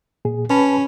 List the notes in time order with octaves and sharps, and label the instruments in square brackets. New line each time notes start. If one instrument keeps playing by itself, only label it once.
[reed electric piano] A#2 G#4
[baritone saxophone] C#4 [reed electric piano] B4 A5 B5